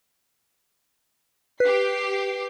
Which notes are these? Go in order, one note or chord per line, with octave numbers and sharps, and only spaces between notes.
G4 B4 C7